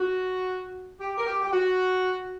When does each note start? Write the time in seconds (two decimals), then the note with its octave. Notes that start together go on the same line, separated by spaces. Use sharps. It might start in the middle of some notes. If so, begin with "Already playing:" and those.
Already playing: F#4
1.00 G4
1.18 A#4
1.26 G4
1.42 G4
1.51 F#4